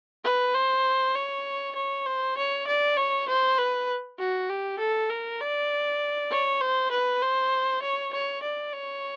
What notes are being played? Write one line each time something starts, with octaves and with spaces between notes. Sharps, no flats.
B4
C5
C#5
C#5
C5
C#5
D5
C#5
C5
B4
F#4
G4
A4
A#4
D5
C#5
C5
B4
C5
C#5
C#5
D5
C#5